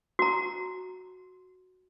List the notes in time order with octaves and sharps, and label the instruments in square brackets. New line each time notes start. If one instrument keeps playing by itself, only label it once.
[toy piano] F#4 A#5